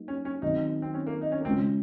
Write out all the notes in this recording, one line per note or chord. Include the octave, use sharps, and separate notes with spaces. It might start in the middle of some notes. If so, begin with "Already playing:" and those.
Already playing: F#3 A#3 D#4
C#4
C#4
D#3 F#3 C4 D#4
C4
C#4
A#3
D#4
C#4
A#3
C#3 G#3 C4 C#4 F4